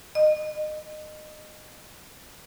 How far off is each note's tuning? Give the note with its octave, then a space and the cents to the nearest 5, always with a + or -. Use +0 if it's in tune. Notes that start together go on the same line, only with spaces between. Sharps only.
D#5 -25